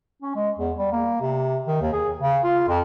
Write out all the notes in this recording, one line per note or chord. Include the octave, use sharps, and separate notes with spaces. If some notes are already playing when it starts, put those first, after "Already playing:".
C#4
G#3
E2
G3
A#3
C3
D#3
D#2
G#4
C#3
F4
F2